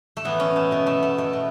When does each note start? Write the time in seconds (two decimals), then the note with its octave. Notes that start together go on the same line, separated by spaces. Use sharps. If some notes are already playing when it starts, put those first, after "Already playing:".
0.17 A3
0.24 A2 E3 B3
0.40 C#4
0.56 A3
0.71 B2 B3
0.86 A3
1.03 A3
1.18 B2 A3
1.33 B3